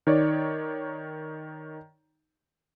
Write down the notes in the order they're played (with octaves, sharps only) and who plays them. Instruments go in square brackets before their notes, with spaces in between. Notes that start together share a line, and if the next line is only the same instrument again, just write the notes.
[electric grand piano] D#3 D#4 C#5 D5